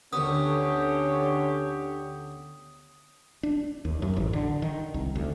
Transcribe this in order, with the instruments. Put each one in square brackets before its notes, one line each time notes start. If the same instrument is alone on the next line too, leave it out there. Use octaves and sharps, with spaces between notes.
[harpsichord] D2 B3 [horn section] D3 C#4 G4 [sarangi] C#5 [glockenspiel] D#6
[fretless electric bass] D4
D#2
F#2
A1
D3
D#3
C2
D2